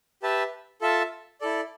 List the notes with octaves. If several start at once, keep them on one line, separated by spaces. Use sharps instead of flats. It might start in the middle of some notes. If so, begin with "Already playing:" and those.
G4 B4 E5 A5
F4 A4 E5 A5
E4 A4 D5